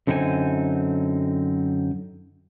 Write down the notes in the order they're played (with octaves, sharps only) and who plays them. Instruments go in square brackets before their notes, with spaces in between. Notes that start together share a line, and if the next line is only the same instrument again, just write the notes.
[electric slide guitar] F#2 D3 C4 D#4 F#4 G#5